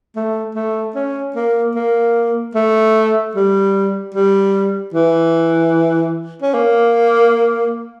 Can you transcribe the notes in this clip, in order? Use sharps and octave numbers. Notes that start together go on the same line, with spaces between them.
A3
A3
C#4
A#3
A#3
A3
G3
G3
E3
C#4
A#3